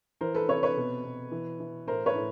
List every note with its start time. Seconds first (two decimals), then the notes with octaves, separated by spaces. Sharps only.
0.21 E3 A#4 C5
0.35 A4 B4
0.48 C3 B4 C#5
0.63 B4 C#5
0.77 B2
1.05 B2
1.32 E3
1.60 E3
1.87 A2 A#4 C5
2.06 B4 C#5
2.15 A2